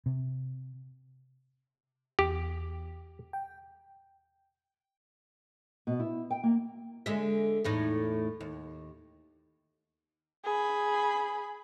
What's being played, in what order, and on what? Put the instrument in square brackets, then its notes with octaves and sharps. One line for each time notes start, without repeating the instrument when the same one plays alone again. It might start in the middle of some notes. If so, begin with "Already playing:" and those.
[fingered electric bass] C3
[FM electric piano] E2 [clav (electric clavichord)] G4
[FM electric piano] G5
[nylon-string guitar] B2
E4
G5
A#3
[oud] D3 G#3 E5
E2 A2 D#4
D#2
[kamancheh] G#4 B5